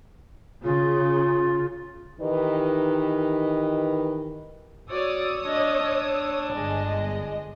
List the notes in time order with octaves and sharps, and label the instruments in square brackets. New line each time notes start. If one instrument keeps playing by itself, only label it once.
[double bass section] C#3 [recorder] F4
[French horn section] D#3 E3 D#4 G4 B4 D#5
[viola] F#4 D5 [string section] C#5 D#6 E6
[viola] D4 D#5
D4
[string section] G1 G#3 D#5